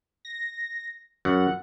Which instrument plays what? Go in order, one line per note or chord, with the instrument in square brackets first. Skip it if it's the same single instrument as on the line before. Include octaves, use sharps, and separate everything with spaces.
[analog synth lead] A#6
[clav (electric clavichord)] F#2 [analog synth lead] F#5